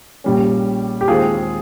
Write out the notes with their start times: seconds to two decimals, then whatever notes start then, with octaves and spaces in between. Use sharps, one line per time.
0.24 A#1 A#2 G3 C#4
1.01 G4
1.08 D#2 D#3 G#3 C4 F4 G#4